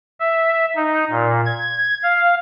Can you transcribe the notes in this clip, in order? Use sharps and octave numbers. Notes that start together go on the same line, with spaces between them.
E5
D#4
A#2
G#6
F5